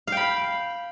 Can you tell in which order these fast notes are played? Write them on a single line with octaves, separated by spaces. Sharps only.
F5 G5 B5